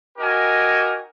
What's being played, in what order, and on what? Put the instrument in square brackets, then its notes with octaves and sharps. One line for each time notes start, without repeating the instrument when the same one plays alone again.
[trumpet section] D#4 F#4 G4 A#4 G#5